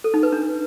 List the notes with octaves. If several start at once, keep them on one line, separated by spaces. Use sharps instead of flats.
A4
D#4
B4
D4